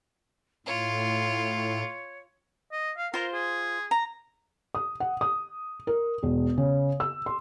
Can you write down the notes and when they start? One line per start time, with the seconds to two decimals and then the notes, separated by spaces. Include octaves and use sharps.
0.66 A2 F4 C#5
2.72 D#5
2.97 F5
3.14 F4 A#4 C5
3.34 G#4
3.91 A#5
4.75 D#6
5.00 F#5
5.21 D#6
5.87 A#4
6.23 E1
6.58 C#3
7.00 E6
7.26 C6